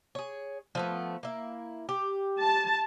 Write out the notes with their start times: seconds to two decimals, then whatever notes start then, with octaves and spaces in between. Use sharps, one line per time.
0.15 G#4 C#5
0.75 F3 A3 B3
1.23 A#3 E4
1.89 G4
2.41 A5